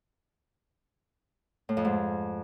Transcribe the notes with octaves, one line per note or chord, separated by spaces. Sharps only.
A2
F2
G#2